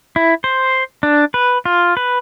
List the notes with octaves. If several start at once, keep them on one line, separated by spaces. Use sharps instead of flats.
E4
C5
D4
B4
F4
B4